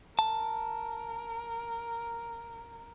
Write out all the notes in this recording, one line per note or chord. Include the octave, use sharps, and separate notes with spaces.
A#4 A5